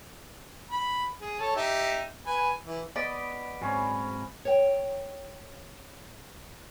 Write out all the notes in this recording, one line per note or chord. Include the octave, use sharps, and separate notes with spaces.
B5
G#4
A4 C#5 A5
D#4 G4 E5
B4 G#5
E3
B3 D5 D#5 B5 D6
G#2 F#3 C4 C#4 B4 C#5
C#5 G5